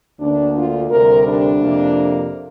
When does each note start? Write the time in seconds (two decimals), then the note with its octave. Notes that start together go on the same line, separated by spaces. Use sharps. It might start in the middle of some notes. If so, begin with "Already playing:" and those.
0.19 D2 D3 A#3 D4
0.55 F4
0.90 D2 C3 G3 A#4
1.26 D4
1.62 F2 C3 A#3